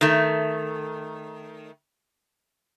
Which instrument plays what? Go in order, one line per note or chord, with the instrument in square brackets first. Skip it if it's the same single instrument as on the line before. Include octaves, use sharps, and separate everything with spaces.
[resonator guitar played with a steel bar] D#3 A3